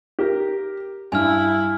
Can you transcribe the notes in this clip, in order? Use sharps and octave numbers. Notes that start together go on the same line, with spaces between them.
G4 A#4
G2 E4 G#5 F6